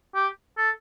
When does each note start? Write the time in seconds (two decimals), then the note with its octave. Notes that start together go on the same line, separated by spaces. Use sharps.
0.15 G4
0.58 A4